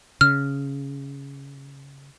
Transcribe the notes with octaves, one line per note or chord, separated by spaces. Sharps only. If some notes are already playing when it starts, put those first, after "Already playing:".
C#3 F6